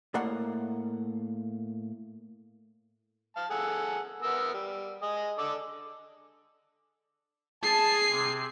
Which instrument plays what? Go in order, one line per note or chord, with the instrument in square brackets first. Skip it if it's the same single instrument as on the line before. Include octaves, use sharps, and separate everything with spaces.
[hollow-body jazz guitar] A2 A3 A#3 D5 F#5
[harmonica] F5 A5
G#4 A4 F#5
B3 A#4 E6
G3
G#4 D#5
D4 A4 D5
[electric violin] G#4 C7 [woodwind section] A5
[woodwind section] C3